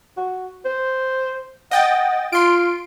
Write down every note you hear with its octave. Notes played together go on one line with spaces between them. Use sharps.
F#4
C5
D#5 F#5 G5 A6
F4 C6 D7